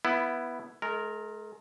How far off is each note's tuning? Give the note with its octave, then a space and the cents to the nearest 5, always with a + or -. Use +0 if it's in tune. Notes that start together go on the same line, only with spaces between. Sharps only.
B3 +0 E4 +15
G#3 +40 A#4 -10